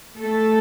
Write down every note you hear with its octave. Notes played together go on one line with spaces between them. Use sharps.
A3 A4